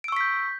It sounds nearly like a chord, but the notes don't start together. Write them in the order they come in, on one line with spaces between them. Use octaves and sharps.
D7 E6 C#6 B6 G6